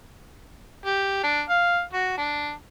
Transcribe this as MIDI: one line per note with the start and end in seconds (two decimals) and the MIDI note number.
0.85 1.20 67
1.23 1.41 62
1.49 1.81 77
1.93 2.14 66
2.17 2.51 62